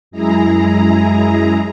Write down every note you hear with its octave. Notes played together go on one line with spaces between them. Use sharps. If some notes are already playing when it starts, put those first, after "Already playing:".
F#2 G#3 E4 G#4 A#5